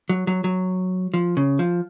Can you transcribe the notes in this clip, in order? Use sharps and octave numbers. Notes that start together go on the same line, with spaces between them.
F#3
F#3
F#3
F3
C#3
F3